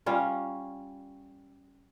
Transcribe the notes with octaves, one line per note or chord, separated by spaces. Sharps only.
G3 C#4 F4